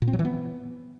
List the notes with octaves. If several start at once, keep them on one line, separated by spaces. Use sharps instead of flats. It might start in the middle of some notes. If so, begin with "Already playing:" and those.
A#2
C4
F#3
E3
B3